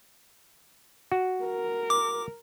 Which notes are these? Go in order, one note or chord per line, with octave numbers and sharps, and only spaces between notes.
F#4
A#4
D6